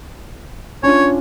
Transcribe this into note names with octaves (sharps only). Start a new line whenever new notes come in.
C#4 D4 F4 C#5